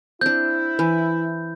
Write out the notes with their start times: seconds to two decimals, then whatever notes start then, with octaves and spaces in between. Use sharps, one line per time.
0.21 C4 D4 E4 G6
0.79 E3